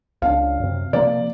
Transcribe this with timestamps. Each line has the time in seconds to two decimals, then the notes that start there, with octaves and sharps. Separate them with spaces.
0.22 C#2 C4 D4 F5
0.60 F#2 C3
0.93 C3 F3 A#3 D5